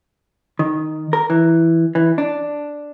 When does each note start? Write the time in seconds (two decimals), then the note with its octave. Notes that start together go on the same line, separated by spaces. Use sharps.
0.59 D#3
1.13 A#4
1.30 E3
1.95 E3
2.18 D4